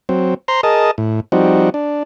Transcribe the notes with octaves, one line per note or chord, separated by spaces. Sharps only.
F#3 C4
C5 A#5 C6
G#4 A#4 D#5 A5
A2
F3 G3 C4 D#4 F#4
D4